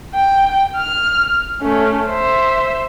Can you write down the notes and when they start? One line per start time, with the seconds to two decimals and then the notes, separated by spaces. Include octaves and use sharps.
0.15 G5
0.77 F6
1.62 A3 C#4
2.09 C5 E5